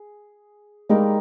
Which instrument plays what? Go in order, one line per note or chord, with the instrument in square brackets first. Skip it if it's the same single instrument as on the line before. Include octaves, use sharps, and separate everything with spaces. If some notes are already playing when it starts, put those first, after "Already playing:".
Already playing: [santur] G#4
[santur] G3 A#3 D#4 A#4 [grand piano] G#3